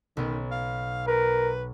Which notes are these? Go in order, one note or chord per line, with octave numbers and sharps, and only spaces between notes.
B1 D#3 B3
F5
A#4 B4